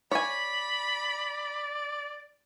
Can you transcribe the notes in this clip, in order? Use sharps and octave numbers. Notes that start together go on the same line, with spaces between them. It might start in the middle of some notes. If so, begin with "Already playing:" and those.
C#5 D5 G#5 B5